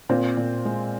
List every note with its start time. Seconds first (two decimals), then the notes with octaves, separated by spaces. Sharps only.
0.09 A#2 C4
0.37 A#2
0.65 G#3